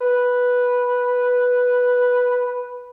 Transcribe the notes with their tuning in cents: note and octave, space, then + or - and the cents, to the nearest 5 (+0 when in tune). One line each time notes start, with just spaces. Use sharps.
B4 -5